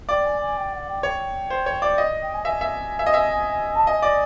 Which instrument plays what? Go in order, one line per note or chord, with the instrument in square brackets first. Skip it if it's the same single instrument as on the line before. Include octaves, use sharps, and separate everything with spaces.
[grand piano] D5 [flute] G5
[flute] G#5
G#5
G5
F#5
G5
[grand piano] C#5 [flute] G5
[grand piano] C5
C#5
D5
D#5
[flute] G5
G#5
[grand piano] E5 [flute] G#5
[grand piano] E5
E5
D#5
E5
[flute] A5
[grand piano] D#5 [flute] G#5
[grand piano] D5